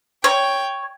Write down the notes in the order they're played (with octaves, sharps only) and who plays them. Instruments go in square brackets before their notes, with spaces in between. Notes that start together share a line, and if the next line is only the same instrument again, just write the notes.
[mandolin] C#5 [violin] G5